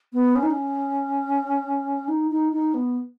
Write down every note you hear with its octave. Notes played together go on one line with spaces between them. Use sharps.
B3
C#4
D#4
C#4
D#4
D#4
D#4
B3